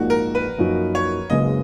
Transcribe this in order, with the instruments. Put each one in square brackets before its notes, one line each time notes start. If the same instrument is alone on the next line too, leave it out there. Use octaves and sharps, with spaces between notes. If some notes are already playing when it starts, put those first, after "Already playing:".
Already playing: [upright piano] A#1 G#2 F3 A#3 D#4 [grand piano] F#4
[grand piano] A#4
B4
[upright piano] F#2 F3 A#3 D#4 F#4
[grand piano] C#5
[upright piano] F#1 F#2 C#3 G#3 B3 [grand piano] D#5